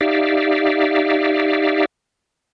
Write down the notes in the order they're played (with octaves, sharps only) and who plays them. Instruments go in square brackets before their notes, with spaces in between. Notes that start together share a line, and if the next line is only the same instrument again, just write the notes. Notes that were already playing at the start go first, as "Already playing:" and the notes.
[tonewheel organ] D#4 G4 D5 E5 F5